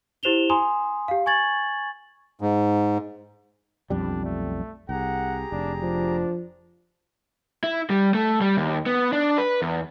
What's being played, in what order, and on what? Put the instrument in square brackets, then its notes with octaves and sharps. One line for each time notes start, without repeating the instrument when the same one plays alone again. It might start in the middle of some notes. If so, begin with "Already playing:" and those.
[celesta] E4 G4 C5 E7 F7 G7
G#5 A#5 C6 D#6
G4 F5
G#5 C#6 G#6 A6 F#7
[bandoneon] G#2
[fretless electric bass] B1 F2 G3 [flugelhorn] D4
[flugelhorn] A3
[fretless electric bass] C2 [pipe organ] G4 G#4 A#5 [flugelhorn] F#5
[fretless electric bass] F1 [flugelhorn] D4
[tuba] F3 [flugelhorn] D4
[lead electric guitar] E4
G3
A3
G3
D#2
B3
D4
B4
E2